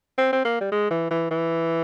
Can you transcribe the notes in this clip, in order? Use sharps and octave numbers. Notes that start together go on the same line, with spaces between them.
C4
C4
A#3
G3
G#3
E3
E3
E3